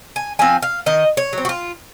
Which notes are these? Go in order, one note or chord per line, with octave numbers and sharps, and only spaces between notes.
G#5
F3 C4 G#5
F5
D#3 D#5
C#5
F#3 C4
F#4
F4